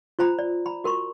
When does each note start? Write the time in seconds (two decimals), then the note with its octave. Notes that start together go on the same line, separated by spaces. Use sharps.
0.19 F4 C5 A#5 B5
0.39 D5
0.66 A#5 B5
0.84 F#4 A#4 B5 C#6